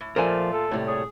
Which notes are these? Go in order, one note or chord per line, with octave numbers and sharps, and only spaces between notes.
A2
A#2 F3 A3 F4 A#4 C5 D5 G#5
A4
A2 C3 G3
G#4 C#5